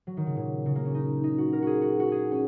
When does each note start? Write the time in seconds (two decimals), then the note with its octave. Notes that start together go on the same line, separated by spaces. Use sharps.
0.07 F#3
0.17 D#3
0.26 C#3
0.36 A#2
0.66 C#3
0.75 A#3
0.85 C#4
0.95 D#4
1.24 D#4
1.38 F#4
1.53 A#4
1.62 F#4 G#4
1.82 F#4
2.00 F#4
2.12 G#4
2.32 C#4